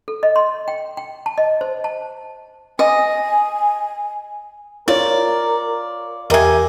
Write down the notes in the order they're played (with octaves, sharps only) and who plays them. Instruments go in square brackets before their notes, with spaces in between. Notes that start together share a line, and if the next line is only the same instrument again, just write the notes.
[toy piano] A4
D#5
C6
G5
G5
A5
D#5
C5
A5
[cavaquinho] D#5 [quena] G#5
[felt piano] F4 C#5 [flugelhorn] A#4 [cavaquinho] D5
[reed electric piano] E2 A#4 E5 [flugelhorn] G4 [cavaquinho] D#5 G#5